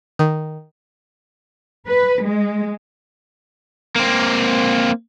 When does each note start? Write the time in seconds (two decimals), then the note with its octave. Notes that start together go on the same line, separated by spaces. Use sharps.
0.19 D#3
1.87 B4
2.23 G#3
3.96 A#3 C4